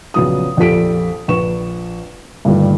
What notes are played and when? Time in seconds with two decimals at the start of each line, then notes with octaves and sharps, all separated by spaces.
0.14 A#1 C#3 F#3 B3 D#6
0.57 A#1 F2 G4 A4 B6 D7
1.28 A#1 B4 C#6 E7
2.45 G2 A#2 D3 D#3 G3 A3